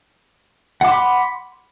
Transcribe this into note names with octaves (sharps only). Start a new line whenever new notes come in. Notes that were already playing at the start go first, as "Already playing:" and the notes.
F#5 B5 C6 D6